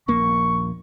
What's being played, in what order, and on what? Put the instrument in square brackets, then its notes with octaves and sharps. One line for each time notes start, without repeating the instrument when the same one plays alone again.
[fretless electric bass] D#1 A#1 A#3 [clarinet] C#6